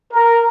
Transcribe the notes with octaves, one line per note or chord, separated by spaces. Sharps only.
A#4